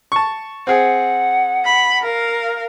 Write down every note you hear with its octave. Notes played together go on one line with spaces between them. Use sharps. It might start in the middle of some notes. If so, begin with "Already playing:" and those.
A5 C#6
C4 G#4 F#5
B5
A#4 F5